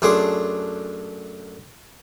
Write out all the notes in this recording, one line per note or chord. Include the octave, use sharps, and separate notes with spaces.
F#2 A3 D4 G#4 C6 D6